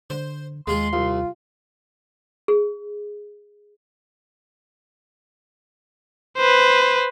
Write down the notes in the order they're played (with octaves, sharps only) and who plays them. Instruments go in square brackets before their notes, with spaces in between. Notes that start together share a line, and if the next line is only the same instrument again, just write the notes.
[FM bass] D3 [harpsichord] C5
[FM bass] D#2 [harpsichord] G#3 F4 G#4 [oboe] C6
[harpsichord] C2 [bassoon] F4
[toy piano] G#4
[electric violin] B4 C5